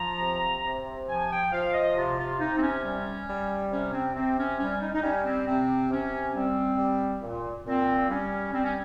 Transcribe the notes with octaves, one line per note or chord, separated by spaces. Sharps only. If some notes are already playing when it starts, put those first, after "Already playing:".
Already playing: F3 A#5
C3
C3
F3 G#5
G5
F3 F5
D#5
C3 F4
F4
C3 D#4
C4
C#4
G3 C#4
G3
C3 C#4
C4
C3 C4
C#4
G3 C#4
D#4
D#4
G3 C#4
C4
C3 C4
C3 C#4
G3 C4
G3
A#2
A#2 C4
G3 C#4
G3 C4
C#4